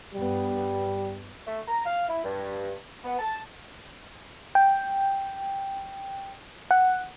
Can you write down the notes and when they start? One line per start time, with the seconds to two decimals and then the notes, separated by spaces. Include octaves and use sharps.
0.14 G2 G3 B3
1.46 A3
1.68 A#5
1.85 F5
2.08 E4
2.24 G2
3.04 B3
3.19 A5
4.55 G5
6.71 F#5